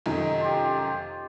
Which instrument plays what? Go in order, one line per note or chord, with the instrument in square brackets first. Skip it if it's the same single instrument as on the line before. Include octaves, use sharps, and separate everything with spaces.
[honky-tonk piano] F1 F#2 D#3 [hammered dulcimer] D#5
[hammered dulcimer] F4 G4